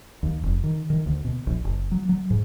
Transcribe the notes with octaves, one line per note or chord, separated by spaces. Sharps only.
D#2
F1
D#3
D#3
D2
B2
A#1
F#1
F#3
F#3
G#2